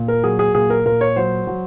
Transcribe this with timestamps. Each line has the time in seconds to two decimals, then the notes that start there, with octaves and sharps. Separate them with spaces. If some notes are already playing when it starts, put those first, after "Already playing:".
Already playing: A#2
0.08 A#4
0.24 F#3 G#4
0.39 G#4
0.54 A#2 G#4
0.70 A#4
0.85 A#2 A#4
1.01 C#5
1.16 F#3 C5
1.47 F#3